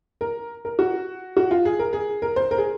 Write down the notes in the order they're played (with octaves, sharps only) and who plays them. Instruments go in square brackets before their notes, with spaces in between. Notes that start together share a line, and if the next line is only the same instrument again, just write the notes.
[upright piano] A#4
A#4
F#4
F#4
F4
G#4
A#4
G#4
A#4
C5
A#4
G#4